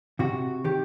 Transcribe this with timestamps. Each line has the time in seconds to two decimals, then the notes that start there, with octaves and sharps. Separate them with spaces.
0.19 C3 F#4
0.64 D#3 G4